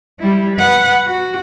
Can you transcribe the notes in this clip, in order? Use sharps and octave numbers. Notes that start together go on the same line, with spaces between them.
G3 E4
B4 F#5
F#4